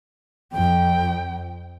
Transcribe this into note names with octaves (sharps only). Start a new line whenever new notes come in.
F2 G5